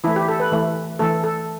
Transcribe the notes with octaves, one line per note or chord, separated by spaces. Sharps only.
E3 A3 E4
G4
A4
B4
E3 A3
E3 A3 A4
A4